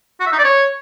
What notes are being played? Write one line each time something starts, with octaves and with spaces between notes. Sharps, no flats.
F#4
E5
D#4
D5
C#5